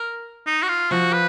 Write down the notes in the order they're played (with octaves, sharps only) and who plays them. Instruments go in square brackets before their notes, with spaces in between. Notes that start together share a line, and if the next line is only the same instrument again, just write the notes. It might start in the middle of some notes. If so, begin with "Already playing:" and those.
Already playing: [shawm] A#4
D#4
F#4
F4
[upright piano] F3 [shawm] F#4
[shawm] B4